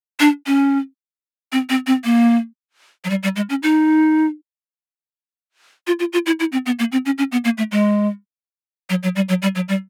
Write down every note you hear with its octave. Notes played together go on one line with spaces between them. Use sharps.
D4
C#4
C4
C4
C4
A#3
F#3
G3
G3
G#3
C#4
D#4
F4
F4
F4
E4
E4
C4
B3
A#3
C4
C#4
C#4
B3
A#3
A3
G#3
F#3
F#3
G3
F#3
G3
F#3
G3